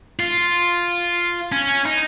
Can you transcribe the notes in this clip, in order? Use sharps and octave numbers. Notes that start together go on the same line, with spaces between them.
F4
C#4
D#4